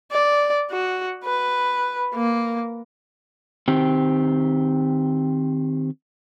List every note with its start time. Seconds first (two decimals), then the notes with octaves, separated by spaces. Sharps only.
0.12 D5
0.71 F#4
1.24 B4
2.15 A#3
3.68 D#3 C4 G4